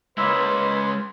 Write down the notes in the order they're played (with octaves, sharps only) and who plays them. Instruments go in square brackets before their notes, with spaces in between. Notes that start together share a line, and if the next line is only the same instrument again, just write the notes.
[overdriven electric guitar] G#3 C#4 [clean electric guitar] A#3 E4 [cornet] B4 [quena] C6